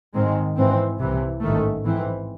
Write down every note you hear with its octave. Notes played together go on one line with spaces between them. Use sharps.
G#2 D#3 G#3 C4
G#2 E3 C4
C2 C3 E3
A1 G#2 D#3 A3
G#2 E3 C4